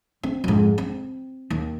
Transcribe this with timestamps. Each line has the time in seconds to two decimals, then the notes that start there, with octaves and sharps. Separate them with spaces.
0.23 C4
0.44 F2 G#2
0.78 C4
1.50 D#2